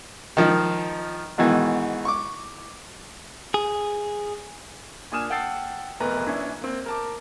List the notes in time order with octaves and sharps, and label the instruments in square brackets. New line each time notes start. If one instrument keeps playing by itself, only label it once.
[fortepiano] D#3 F3 D#4
G#2 B2 D#3 E3
C#6 D6
[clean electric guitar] G#4
[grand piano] A#2 D4 G#5 D#6 F6 E7
F#5 G5 A5 E6 A6 C7
F1 B1 E2 A#4 B4 A#5
A#1 C#4 D4 E4
A#3 C4
A#4 A5 D6